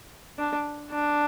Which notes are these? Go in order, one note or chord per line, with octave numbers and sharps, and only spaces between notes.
D4
D4